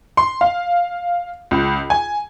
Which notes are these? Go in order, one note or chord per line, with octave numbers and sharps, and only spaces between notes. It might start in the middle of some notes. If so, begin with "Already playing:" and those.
C6
F5
C#2
G#5